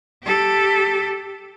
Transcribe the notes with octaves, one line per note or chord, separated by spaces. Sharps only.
G4 A4